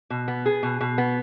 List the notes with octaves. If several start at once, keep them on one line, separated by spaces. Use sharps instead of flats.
B2
B3
G#4
B2
B2
B3